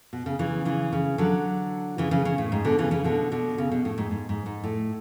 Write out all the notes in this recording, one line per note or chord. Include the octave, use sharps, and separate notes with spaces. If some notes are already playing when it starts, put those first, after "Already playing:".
B2
C#3
C#3 E3
C#3 E3
C#3
D3 F#3
C#3 E3
C#3 E3
C#3
A2
G#2
B2 D3
C#3 E3
C#3 E3
B2 D3
B2 D3
C#3
B2
A2
G#2
G#2
G#2
G#2
A2